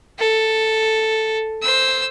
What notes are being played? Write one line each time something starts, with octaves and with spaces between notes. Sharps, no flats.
A4
C5 E6